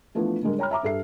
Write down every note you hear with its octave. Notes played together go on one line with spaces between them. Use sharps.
E3 F3 A3 B3 D4
D3 G3 G#3 A#4
C#5 G5 A#5 B5 F6
E5 A#5 D6
G2 G4 A4 E5 C7